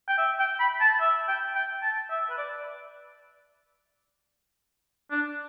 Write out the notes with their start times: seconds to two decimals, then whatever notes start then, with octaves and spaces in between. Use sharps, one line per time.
0.08 G5
0.18 E5
0.39 G5
0.60 B5
0.81 A5
1.01 E5
1.28 G5
1.55 G5
1.83 A5
2.10 E5
2.30 B4
2.38 D5
5.11 D4